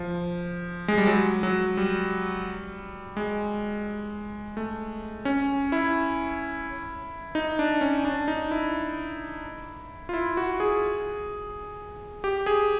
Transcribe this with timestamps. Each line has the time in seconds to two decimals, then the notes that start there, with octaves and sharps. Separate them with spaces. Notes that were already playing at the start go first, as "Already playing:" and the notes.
Already playing: F3
0.88 G#3
0.98 G3
1.07 F#3
1.43 F#3
1.77 G3
3.17 G#3
4.57 A3
5.25 C#4
5.72 E4
7.35 D#4
7.59 D4
7.81 C#4
8.05 D4
8.28 D#4
8.51 E4
10.09 F4
10.13 E4
10.37 F#4
10.60 G#4
12.24 G4
12.46 G#4